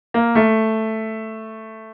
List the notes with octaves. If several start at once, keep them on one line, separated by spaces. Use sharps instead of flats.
A#3
A3